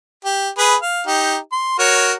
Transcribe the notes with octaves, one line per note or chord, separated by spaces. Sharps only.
G4
G#4 B4 B5
F5
D#4 G4
C6
F#4 A#4 C#5